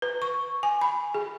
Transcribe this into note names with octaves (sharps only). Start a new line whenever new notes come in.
B4
C#6
G#5
B5
G#4